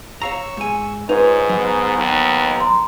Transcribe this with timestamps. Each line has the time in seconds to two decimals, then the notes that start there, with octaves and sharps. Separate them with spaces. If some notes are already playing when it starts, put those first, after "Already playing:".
0.22 C#5 F5 A#5 C#6 E6
0.57 G#2 G#5
1.09 G#2 D#4 F4 B4 C#5
1.49 F#3 B3 D#4
1.97 D#2
2.56 A#5 C6